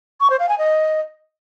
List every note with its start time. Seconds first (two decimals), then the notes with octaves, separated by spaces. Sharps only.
0.21 C#6
0.30 C5
0.40 F5
0.49 G#5
0.58 D#5